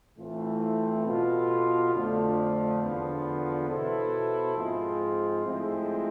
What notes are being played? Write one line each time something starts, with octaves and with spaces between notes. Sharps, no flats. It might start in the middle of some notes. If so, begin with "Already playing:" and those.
A2 E3 A3 C4 F4
B2 B3 F4 A4
F2 D3 F3 A3 D4
E2 D3 F3 B3 F4
B2 B3 E4 A4 C5
G#2 F3 G#3 C4 F4
A2 F3 G#3 C4 E4